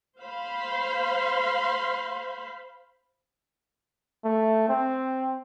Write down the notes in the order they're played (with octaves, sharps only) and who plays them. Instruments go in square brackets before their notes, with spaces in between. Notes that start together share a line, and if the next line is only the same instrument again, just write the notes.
[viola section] C5 F5 B5 C6
[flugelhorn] A3
C4